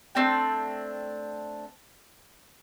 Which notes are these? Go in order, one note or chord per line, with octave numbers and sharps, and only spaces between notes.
A3 C4 D4 G5